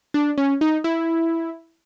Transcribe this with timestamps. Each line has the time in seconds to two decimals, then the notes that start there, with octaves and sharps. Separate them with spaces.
0.14 D4
0.38 C#4
0.61 D#4
0.84 E4